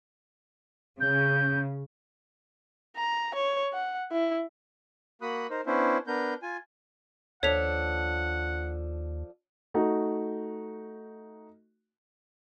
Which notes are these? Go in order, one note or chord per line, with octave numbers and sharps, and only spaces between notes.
C#3 G6
A#5
C#5
F#5
E4
A#3 F#4 B5 D#6 F#6
D#4 A#4 C5
B3 C#4 D4 E4 C5
B3 D4 A#4 G6
F4 G#5
D#2 F3 D4 A4 C#5 F#5 B6 F7
A3 D#4 F#4